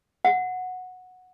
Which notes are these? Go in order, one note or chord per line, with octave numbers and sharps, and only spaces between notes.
F#5